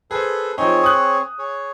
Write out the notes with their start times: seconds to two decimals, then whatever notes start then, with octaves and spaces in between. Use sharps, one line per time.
0.11 G#4 A4 B4 C5
0.58 F3 C4 D#4 G#4 C#5
0.84 D#6 F#6
1.39 G#4 C#5